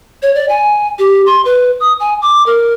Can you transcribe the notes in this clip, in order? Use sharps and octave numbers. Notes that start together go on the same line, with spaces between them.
C#5
D5
G#5
G4
C6
B4
D#6
G#5
D6
A#4